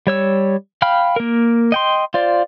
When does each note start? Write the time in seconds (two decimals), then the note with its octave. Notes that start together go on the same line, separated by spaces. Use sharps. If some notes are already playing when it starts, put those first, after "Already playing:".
0.07 G3 C#5 E6
0.82 F5 G5 B5 F6
1.16 A#3 A#4
1.72 D#5 G5 C6
2.14 F4 C5 D5